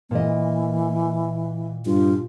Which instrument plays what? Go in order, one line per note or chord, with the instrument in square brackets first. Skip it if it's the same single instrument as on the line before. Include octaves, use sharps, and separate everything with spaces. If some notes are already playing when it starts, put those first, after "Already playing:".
[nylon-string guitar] A#2 D#5 [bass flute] E3 [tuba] A#3
[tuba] G2 [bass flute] F4